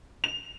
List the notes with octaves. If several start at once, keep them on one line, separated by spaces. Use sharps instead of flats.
F7